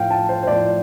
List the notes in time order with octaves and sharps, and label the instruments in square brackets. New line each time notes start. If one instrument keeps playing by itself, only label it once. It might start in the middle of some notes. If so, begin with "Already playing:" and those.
Already playing: [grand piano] A2 F3 F5 G5
A5
C5
C5
A2 F3 D5